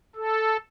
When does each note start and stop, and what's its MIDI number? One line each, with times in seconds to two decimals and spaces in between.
0.16 0.57 69